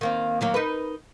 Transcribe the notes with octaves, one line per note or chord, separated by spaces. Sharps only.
D#3 A#3 C4
D#3 F#3 A#3
D#4 A#4 B4